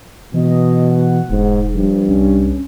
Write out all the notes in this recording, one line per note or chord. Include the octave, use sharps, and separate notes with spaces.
B2 E3 D#5
F#5
E1 G#2
G2 F3
C2 C#4